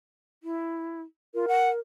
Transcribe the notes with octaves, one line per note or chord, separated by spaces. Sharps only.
E4
F4 A#4
F#5